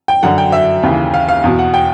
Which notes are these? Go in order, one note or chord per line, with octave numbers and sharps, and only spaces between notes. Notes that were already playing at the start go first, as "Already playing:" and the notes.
G5
F#2 D3 F#5
G5
E5
D#2 C#3 E3
F5
F5
E2 B2 F5
F#5
G5